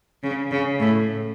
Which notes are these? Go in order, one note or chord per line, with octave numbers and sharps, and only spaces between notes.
C#3
C#3
A2